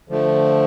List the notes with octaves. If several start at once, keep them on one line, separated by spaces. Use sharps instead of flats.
D3 F3 A3